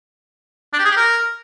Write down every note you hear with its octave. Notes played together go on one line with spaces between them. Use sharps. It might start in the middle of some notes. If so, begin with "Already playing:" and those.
D4
G4
G#4
G4
A#4